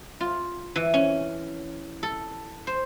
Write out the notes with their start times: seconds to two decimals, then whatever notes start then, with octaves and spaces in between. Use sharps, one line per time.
0.20 F4
0.76 E3
0.94 C#4
2.03 A4
2.67 C5